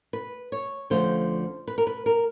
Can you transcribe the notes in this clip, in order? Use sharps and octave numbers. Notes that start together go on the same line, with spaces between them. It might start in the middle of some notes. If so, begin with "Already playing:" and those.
B4
C#5
D2 D3 F3 A3 C#4 C5
B4
A#4
B4
A#4